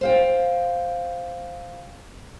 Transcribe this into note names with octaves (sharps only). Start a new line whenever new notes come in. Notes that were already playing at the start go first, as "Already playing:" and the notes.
C5 F5 G5